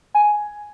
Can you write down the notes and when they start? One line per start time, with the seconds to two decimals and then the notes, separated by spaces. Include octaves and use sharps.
0.14 G#5